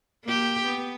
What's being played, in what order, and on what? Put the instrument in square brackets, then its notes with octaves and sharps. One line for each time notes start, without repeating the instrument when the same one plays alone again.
[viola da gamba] A#3 G4
B3